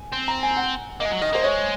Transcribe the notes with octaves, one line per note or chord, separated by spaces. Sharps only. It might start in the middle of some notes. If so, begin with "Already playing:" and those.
Already playing: G#5
C4
A#5
G#5
F#5
A#3 D#5
G#3
F#3
D#3 D#5
A#3 C5
G#3 C#5